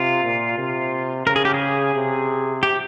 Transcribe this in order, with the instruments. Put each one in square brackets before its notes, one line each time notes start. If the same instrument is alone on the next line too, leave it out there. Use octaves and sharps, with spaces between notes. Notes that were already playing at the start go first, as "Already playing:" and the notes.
Already playing: [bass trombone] C3 [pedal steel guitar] F4
[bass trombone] A#2
C3
[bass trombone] C#3 [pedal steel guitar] A#4
[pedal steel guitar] G#4
G4
G#4
[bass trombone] C3
[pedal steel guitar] G4